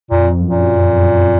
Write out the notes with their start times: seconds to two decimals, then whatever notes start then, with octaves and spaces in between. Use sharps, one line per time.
0.11 F2 A#2
0.40 F#2
0.49 A#2
0.69 F#2